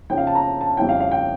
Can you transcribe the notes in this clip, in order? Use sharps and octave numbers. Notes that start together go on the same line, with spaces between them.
F2 C#3 F3 C#4 G5
F5
A5
A#5
A5
F2 C#3 G3 C#4 E4 G5
F5
F5
G5